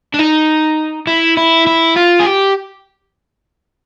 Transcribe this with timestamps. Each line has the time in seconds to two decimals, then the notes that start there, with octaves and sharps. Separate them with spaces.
0.14 D4
0.19 D#4
1.07 E4
1.37 E4
1.67 E4
1.96 F4
2.20 G#4
2.26 G4